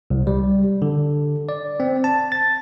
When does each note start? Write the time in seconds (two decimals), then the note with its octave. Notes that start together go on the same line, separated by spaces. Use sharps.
0.10 C2
0.27 G3
0.82 D3
1.49 D5
1.80 C4
2.04 A5
2.32 A6